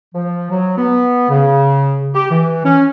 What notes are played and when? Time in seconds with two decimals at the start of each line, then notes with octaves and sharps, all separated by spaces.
0.14 F3
0.50 F#3
0.77 B3
1.29 C#3
2.14 G4
2.30 E3
2.64 C#4